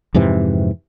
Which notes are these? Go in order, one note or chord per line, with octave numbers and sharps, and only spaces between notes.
F2 G#2 C3 E3